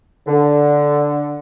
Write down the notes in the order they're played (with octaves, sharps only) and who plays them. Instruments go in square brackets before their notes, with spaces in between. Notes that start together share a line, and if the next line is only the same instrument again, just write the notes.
[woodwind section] D3